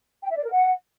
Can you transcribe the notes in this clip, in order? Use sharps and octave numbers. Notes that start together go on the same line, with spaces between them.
G5
E5
D5
A#4
F#5